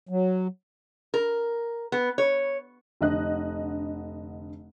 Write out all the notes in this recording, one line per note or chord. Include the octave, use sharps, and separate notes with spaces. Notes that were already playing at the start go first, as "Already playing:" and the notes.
F#3
A#4
B3
C#5
F1 D3 D#5 F#6